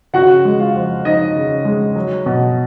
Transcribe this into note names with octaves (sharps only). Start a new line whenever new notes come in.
C#3 F#4 F#5
G#3
F4 F5
F2
F2 D#4 D#5
C#3
G#3
F#3
B2